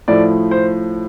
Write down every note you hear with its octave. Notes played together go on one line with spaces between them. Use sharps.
A2 F3 D5
C5